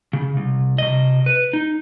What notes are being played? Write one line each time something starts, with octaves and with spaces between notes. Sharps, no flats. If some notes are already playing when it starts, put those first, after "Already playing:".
C#3
C2
C3 D#5
B4
D#4